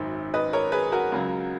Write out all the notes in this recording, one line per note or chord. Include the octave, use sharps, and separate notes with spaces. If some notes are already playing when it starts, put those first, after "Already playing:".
Already playing: G#1 F#2 D#3
B4 D#5
A#4 C#5
G#4 B4
F#4 A#4
C#2 C#3 F#3